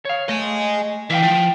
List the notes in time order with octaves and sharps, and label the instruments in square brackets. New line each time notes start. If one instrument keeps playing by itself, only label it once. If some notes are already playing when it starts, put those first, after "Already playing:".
[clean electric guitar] C#5 F5
[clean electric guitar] A3 [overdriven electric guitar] D#5 G#5
[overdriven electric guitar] E3 [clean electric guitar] E5 F5 G5
[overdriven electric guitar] F3